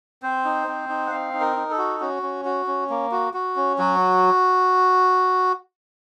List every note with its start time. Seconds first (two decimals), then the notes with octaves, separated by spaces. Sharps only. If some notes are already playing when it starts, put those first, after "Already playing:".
0.23 C4 C5
0.45 D#4
0.67 C4
0.89 D#4
1.07 F#5
1.11 C4 F5
1.34 D#4
1.41 A#4
1.56 D#4
1.71 A4
1.78 F#4
2.00 C#4 F#4
2.22 C#4
2.45 F#4
2.67 C#4
2.90 A#3
3.12 F#4
3.34 F#4
3.56 C#4
3.78 F#3 F#4